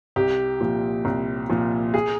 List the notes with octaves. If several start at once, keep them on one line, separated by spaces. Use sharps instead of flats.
C2 G4
A#2 F3
C2
A#2 F3
G#4